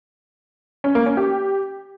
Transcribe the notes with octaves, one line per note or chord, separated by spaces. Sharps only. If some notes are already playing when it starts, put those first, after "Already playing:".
C#4
A#3
C#4
G4